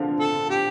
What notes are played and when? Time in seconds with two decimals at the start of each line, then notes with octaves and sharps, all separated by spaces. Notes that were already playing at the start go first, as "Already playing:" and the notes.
Already playing: D3 F3
0.19 A4
0.49 G4